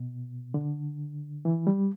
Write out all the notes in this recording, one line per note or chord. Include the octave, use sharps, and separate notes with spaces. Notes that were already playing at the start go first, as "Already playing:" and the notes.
Already playing: B2
D3
E3
G3